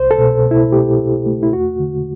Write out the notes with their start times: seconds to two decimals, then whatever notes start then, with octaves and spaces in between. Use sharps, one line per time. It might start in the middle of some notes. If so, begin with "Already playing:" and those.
Already playing: C2 C5
0.11 A4
0.18 B2
0.45 B2
0.51 E4
0.72 A3 G4
0.99 B2
1.26 A3
1.43 E4
1.53 E2 F#4
1.79 D3